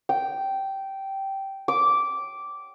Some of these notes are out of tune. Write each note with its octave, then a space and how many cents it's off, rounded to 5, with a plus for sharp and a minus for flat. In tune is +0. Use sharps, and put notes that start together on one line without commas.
G5 -10
D6 -10